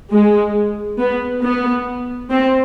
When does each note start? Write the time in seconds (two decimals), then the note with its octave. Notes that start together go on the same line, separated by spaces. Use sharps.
0.11 G#3
0.99 B3
1.43 B3
2.30 C4